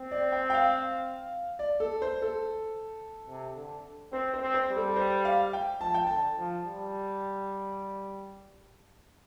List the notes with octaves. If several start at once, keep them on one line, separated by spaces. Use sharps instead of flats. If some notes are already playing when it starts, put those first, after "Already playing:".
Already playing: C4
D5
G5
G5
F5
D5
A4
C5
A4
C3
D3
C4 C5
C5
C4
C5
G3
A4
C5
F5
G5
F3 A5
G5
D3 A5
F3
G3